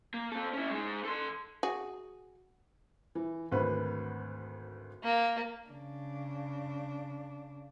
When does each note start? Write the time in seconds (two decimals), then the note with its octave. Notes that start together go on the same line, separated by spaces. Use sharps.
0.14 A#3
0.32 C4 A4
0.53 C#4 E4
0.71 G#3 D#4
1.05 A4 C6
1.63 F#4 G#4
3.15 E3
3.51 G#1 D2 B4
5.03 A#3
5.67 C#3 D4